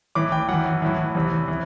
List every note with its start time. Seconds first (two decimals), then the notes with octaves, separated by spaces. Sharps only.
0.15 A2 E3 D6
0.32 G5
0.48 F#2 E3 F#5
0.82 A2 E3
1.15 E2 C3 E3
1.48 E3